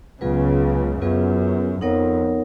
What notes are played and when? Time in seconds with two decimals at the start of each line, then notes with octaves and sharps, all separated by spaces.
0.21 C#2 C#3 F#3 B3 F4 G#4 B4
1.02 F#2 F#3 B3 F4 G#4 B4
1.81 F2 B3 D#4 A#4 C#5 F#5